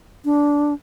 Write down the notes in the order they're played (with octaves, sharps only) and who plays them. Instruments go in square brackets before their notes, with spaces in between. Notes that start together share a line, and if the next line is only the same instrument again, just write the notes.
[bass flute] D4